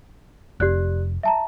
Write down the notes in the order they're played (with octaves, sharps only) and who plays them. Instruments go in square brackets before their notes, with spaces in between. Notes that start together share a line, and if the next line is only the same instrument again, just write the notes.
[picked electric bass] F1 [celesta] G4 D5 F#6
[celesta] E5 A5 A#5